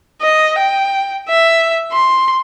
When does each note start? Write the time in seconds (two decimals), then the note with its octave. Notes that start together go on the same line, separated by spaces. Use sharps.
0.22 D#5
0.59 G5
1.29 E5
1.92 C6